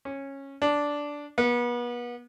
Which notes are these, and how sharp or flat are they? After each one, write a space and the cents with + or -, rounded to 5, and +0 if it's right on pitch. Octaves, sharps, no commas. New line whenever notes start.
C#4 -15
D4 -10
B3 -35